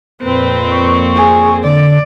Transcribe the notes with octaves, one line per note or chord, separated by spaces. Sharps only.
F2 A#2 C4 B4
C#6
G#4
D3 D5